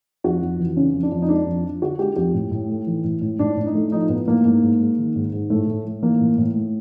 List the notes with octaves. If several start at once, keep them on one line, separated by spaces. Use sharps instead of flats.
F2 F#4
F2
E3
C#3 C#4
F2
D4
F2
D#4
G#3 D4
F2
F3
D3 F#4
G#3 G4
F2 G4
A2
A2
A3
E3
A2
A2
A2 D4
A2
D#4
A3
F3 D#4
A2 B3
A2 A#3
G#2 A#3
G#2
G#3
D#3
G#2
G#2
A2 A3
A2
A3
E3 A#3
A2
A2
A3